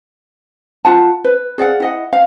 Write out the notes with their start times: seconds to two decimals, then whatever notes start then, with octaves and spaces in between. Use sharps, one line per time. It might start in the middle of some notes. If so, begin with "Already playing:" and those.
0.85 F4 F#5 A5
1.24 B4
1.58 G#4 D5 F5 F#5
1.80 E4 D#5 F#5
2.13 F5